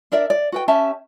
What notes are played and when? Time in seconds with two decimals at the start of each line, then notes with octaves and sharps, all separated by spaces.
0.12 D4 A#4 D5 E5
0.30 D5
0.52 F#4 B4 G5
0.68 C#4 G4 E5 A5